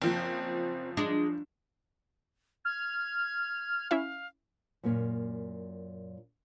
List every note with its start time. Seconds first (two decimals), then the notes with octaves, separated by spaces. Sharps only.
0.02 F#1 F3 C4
0.97 G#3 D4
2.65 F6 G#6
3.91 C#4 E4 E5 F5
4.83 F#2 A#2 A#3 C#4